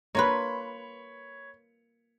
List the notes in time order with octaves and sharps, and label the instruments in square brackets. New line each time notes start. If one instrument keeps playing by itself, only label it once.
[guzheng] A#3 F4 B4 [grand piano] C#5 B5